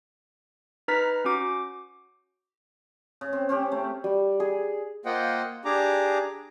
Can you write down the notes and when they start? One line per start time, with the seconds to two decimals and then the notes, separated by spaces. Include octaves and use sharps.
0.88 D#4 B4 A#5 F6 A6 B6
1.25 C#4 F#4 D6
3.21 C#3
3.33 C4
3.49 C4 C#4 G4
3.72 A3
4.04 G3
4.40 G#4
5.05 A#3 F4 C5 D#5 F#5 G5
5.65 D4 G4 G#4 A#5 D6